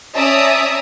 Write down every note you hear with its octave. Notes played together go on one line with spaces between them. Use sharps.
C#4 D5 E5 A5 A#5 D#6